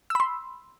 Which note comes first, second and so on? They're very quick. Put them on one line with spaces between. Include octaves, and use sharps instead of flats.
E6 B5 C6